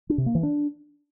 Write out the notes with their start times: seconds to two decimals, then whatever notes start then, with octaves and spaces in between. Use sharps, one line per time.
0.10 D4
0.18 C3
0.26 A#3
0.35 E3
0.43 D4